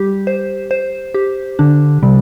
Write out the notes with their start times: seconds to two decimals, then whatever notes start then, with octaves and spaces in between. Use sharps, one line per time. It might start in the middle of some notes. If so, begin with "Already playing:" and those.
Already playing: G3 G4
0.27 C5
0.71 C5
1.14 G4
1.59 D3 D4
2.02 C3 G3